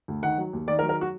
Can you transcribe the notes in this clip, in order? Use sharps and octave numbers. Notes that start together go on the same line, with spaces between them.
D2
D#3 F#5
F#3
D#2
D#3 D5
A#4
F#3
A#4
F#4